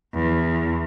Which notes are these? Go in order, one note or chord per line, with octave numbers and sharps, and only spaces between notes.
E2